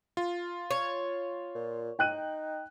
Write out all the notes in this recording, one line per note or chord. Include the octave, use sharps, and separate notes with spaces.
F4
C#5
A#2
D#4 G5 F#6 D#7